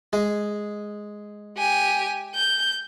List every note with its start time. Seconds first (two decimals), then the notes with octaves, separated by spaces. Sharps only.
0.13 G#3 G#4
1.58 G4 G#5
2.35 G6